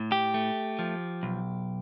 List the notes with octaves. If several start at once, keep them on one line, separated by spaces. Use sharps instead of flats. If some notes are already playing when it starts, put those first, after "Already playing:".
Already playing: A2
G4
A3
F3
B1